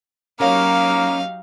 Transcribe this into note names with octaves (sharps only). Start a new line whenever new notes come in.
F#3 A#3 C#4 D#4 G4 A#4 C#5 F5